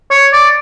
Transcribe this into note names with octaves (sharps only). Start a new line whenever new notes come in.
C#5
D5